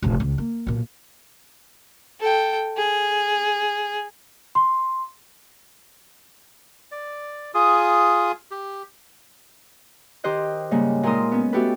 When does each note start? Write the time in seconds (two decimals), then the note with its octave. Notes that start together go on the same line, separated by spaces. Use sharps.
0.03 F1 A#1
0.20 C#2
0.38 A#3
0.67 B1 A#2
2.20 A4 G5
2.77 G#4
4.55 C6
6.92 D5
7.54 F4 G#4 D#6
8.51 G4
10.24 D#3 G4 C5 D#5 F#6
10.71 G#2 C#3 G3 A#3
11.03 A#2 G#3 D#4 A#4 C6 D#6
11.32 B3 C#4
11.53 A3 B3 F#4 G4 A4 B4